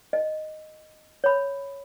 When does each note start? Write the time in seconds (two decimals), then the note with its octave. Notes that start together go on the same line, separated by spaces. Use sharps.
0.13 D#5
1.24 C#5 B5